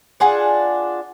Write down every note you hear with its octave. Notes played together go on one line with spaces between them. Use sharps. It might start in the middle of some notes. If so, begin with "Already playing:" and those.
D4 F4 G#4 F#5